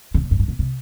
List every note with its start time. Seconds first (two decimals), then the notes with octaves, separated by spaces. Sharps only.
0.14 C#3
0.23 A#2
0.31 G2
0.39 G#2
0.48 A#2
0.59 C3